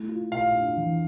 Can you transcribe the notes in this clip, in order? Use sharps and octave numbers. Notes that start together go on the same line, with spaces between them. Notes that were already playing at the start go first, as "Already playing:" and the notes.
Already playing: A3 E4
F4
A#2 F5
D4
E3